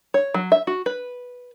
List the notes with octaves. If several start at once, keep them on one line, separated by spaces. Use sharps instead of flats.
C#5
F#3
E5
F#4
B4